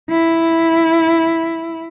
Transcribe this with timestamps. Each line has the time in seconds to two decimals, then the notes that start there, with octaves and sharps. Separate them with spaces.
0.10 E4